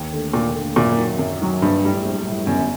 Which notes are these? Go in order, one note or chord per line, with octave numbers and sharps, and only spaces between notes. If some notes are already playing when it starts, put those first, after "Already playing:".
Already playing: D#2
D3 A3
D#2 A#2
D3 A3
F#2 A#2
D#3 F#3
F#2
D#3 F#3
A#1 G2
A2 G3
A#1
A2 G3
G1 F#2